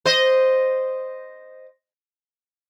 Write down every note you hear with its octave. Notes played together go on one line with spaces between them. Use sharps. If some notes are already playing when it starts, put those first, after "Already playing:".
C5 D#5